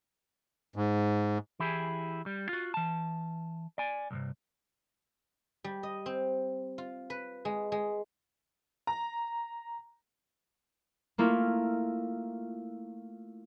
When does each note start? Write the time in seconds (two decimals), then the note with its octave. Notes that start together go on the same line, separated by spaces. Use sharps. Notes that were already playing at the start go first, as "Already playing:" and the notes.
0.76 G#2
1.60 E3 E4 G4 G#4
2.26 G3
2.49 F4 F#4
2.74 E3 A5
3.78 D5 G#5
4.11 B1 G2 C3
5.64 G3
5.83 D#5
6.06 C4
6.78 F4
7.10 B4
7.45 G#3
7.72 G#3
8.87 A#5
11.18 A3 A#3 E4 F4